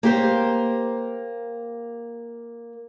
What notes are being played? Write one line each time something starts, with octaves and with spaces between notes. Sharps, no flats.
A#3 G4 C5